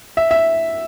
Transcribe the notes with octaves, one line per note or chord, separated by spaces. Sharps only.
E5
E5